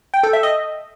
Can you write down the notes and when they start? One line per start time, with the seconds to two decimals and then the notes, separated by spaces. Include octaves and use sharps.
0.14 G5
0.23 A4
0.33 E5
0.43 D#5